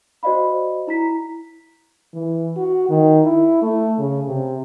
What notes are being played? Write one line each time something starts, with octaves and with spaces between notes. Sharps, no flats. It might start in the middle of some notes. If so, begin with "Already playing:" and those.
F#4 C5 D5 D#5 F5 B5
E4 A#5 B6
E3
F#4
D#3
E4
A3
C#3
C3